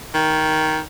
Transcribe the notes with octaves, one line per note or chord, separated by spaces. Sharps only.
D#3